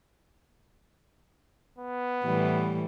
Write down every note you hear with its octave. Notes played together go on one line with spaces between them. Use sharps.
B3
A2 E3 G3